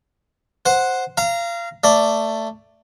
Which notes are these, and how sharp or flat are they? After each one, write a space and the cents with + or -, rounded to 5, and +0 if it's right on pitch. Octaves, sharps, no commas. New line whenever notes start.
C5 +0 F#5 -5
F5 -25 A#5 +0
A3 +15 D5 +0